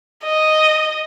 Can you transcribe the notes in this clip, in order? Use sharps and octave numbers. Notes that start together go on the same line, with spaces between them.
D#5